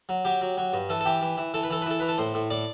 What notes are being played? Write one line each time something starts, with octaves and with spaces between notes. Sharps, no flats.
F#3
F#3 G4
F#3
F#3
G2
E3 A4
A4
E3 G4
E3
E3
E3 A4
B4
E3 A4
B4
E3 A4
E3 B4
A4
A2 C5
A2
A2 D5